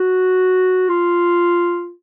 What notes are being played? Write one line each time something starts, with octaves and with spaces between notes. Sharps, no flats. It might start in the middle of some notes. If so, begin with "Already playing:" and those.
Already playing: F#4
F4